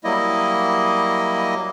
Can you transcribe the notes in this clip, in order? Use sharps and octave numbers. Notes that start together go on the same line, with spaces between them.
F#3 G3 A#3 E4 D#5